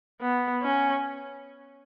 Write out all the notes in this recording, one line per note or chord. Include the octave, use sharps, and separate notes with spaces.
B3
C#4